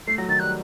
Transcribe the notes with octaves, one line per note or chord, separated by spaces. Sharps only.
A3 C7
F#3 A#6
D#3 A6
G3 F#6